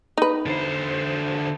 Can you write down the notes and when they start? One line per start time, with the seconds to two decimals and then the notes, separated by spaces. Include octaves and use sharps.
0.18 D#4 B4
0.46 D3 C5